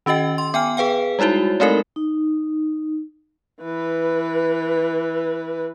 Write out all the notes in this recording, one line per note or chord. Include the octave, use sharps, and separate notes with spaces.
D#3 C#4 F#4 D#5 G5
C6
B3 G5 G#5 F6
G#4 B4 F5 G5
G3 G#3 D#4 E4 F#4
G#3 A3 C4 D#4 A4 A#4
D#4
E3 B4